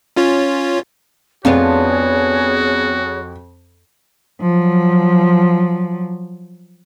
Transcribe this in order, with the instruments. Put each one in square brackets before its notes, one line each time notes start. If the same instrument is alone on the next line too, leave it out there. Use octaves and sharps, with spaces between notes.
[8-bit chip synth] C#4 F4 C#5
[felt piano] F2 [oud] B3 D4 F4 [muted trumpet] F#4 [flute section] G#4 C#5
[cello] F3 F#3